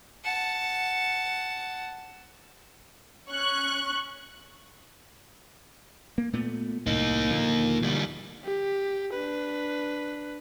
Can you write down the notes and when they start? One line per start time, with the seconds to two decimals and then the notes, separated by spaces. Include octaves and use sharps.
0.24 F#5 A5
3.29 C#4 C#6 F#6
6.18 A#3
6.33 A#2 A3 B3
6.87 C2 A2 A#3 D#4
7.30 A#2 D3 F3
7.82 D2 G3
8.44 G4
9.13 D4 B4